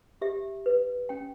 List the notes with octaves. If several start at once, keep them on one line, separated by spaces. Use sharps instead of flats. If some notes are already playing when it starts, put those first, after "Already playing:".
G4 E5
B4
C#4 G5